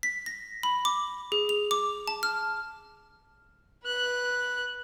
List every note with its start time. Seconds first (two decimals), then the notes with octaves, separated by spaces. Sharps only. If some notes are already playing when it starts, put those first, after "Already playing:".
0.03 B6
0.26 A#6
0.63 B5
0.85 D6
1.32 G#4
1.49 F7
1.71 D6
2.08 A5
2.23 F6
3.85 B4 F#6